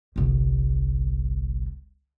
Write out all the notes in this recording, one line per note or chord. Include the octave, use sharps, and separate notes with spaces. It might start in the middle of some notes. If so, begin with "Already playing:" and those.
G1 C2